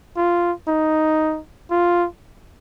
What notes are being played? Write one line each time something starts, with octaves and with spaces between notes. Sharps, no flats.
F4
D#4
F4